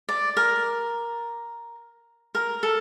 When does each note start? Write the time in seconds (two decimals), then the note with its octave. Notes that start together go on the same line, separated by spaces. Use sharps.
0.09 D5
0.37 A#4
2.35 A#4
2.63 A4